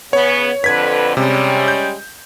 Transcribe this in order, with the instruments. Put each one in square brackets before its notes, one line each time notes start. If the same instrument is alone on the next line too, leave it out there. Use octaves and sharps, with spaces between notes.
[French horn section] C#3 B3 [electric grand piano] C#5
[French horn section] F2 D3 B4 [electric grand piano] G#6 B6
[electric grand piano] C3 [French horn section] G3 G#3 C#4
[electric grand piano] G6